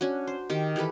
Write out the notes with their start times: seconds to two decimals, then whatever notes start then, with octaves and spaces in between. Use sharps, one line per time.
0.01 C#4 D4 F#4
0.27 C5
0.50 D#3 G4
0.76 E3 G4 A4 B4